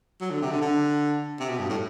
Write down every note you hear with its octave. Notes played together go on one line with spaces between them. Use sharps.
F#3
D3
C3
D3
D3
C3
B2
G2
A2